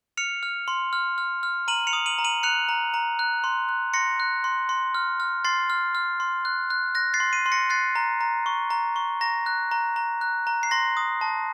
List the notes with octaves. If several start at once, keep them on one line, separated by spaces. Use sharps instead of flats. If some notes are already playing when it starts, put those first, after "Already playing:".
F6 C#7 F7
F6
C6
F6
F6
F6
A#5 D#7 F#7
C#7 F7
D#6
D#7 F#7
A#5
D#7 F#7
F#6 C#7 F7
A#5
A#5
F#6
C6
F#6
C6 A#6 C#7
F#6
C6
C6
F6
F6
C6 A6 C7
F6
F6
C6
F#6
F#6
F#6 A#6
A6 C7
C6
C7 D#7
C6
A#6 C#7
F#6 A6 C7
A#5
A#5
C#6
A#5
C#6
A#5 A#6
F#6
A#5
A#5
F#6
A#5
C7
C6 A#6
D#6
A5